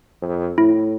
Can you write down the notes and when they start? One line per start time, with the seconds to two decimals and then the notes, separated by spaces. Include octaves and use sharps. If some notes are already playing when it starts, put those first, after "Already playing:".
0.22 F2
0.58 A2 E4